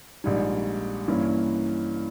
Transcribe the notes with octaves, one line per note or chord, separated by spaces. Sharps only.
A#1 G#2 G3
G2 E3 A#3 C#4 E4